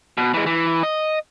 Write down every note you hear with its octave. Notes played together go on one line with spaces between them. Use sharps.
B2
E3 G#3
E3
D#5